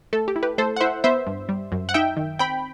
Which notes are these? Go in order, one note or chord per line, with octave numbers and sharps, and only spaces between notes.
A3 A4
G4
E4
G4 B4
A3 A4 C5
F#5
E4 C5 E5
B3 C5 E5
G2
G3
F#2
F#5
D#4 E5 G5
D#3
C4 G5 B5